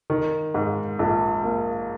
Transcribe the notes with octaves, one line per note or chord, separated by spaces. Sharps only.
D#3
G#2
A#1
A#3